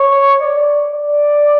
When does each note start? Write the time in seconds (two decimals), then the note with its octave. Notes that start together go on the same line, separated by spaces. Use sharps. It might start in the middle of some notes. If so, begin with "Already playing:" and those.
Already playing: C#5
0.41 D5
0.93 D5